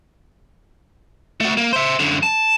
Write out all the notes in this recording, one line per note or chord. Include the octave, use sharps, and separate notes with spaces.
A3 F#4
A#3
C5 E5
F#2 D3
A5